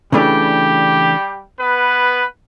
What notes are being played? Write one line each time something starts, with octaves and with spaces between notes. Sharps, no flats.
C#3 E3 G3 A3 D4 G4
B3 B4